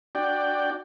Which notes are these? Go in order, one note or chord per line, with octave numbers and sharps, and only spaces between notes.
D4 F#4 D5 G5